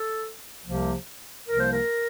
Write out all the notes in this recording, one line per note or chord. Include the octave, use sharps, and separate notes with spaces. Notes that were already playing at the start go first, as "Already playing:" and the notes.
Already playing: A4
C2 C3 F3 A#3
C2 C3 F3 A#3 A#4
C5
A#4